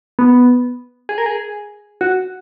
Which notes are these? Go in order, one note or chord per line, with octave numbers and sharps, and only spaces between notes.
B3
G#4
A#4
G#4
F#4